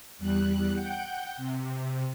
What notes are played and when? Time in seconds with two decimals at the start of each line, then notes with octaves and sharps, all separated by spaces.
0.19 E2 G3 F#6
0.74 F#5 G5 G6
1.37 C3